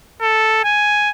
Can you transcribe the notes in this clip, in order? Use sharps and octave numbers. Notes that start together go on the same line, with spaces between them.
A4
G#5